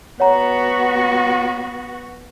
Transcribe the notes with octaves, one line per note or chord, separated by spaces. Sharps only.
B3 F#4 C#5 F#5 A#5